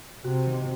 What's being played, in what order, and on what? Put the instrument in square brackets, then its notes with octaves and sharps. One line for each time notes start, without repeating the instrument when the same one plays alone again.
[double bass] C3 [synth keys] F#4
[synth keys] D#3